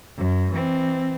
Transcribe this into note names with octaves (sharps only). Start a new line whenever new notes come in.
F#2
E3 C4